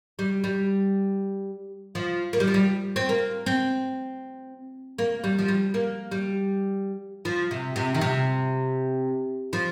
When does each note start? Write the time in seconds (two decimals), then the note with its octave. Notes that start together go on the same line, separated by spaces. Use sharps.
0.19 G3
0.44 G3
1.95 F3
2.33 A#3
2.40 G3
2.47 F3
2.54 G3
2.96 C4
3.09 A#3
3.46 C4
4.98 A#3
5.24 G3
5.39 F3
5.48 G3
5.74 A#3
6.11 G3
7.25 F3
7.51 C3
7.76 C3
7.94 D#3
8.01 C3
9.53 F3